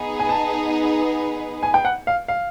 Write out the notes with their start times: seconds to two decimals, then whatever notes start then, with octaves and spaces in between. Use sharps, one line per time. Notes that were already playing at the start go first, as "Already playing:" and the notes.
Already playing: B3 D#4 G#4 B4
0.19 G#5
0.29 A5
1.63 G#5
1.74 G5
1.85 F#5
2.07 F5
2.28 F5